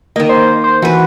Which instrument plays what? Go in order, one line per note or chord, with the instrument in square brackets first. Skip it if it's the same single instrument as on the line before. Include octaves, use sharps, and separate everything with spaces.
[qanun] D#3 A#3 [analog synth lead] D#5
[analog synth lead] C5
C5
[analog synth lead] E3 [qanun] F#4 B4